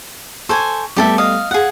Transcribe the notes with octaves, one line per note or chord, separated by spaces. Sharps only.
A4 C5 G#5 C#6
G3 A3 B3 G4 A4 E5
D#5 F5
G#4 F5 F#5